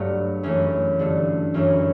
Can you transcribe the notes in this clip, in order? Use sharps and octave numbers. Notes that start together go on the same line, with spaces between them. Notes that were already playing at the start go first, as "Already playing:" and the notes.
Already playing: G2 F#3 A3 B3
F#2 E3 A3 C#4
G2 D3 A3
F#2 E3 A3 C#4